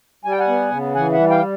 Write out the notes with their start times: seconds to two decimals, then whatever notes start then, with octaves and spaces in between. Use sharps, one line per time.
0.25 G3 G#5
0.32 G5
0.39 F#5 G#5
0.48 B3
0.71 C#3
0.95 E3 F#5 G#5
1.12 E5 F#5
1.19 G3
1.30 F5 G5